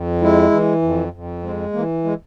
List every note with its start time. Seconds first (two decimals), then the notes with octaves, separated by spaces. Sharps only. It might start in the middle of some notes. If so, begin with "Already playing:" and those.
Already playing: F2
0.21 G#3 E4
0.52 E3
0.82 F2
1.13 F2
1.42 G#3 C4
1.73 E3 A#3
2.04 G#3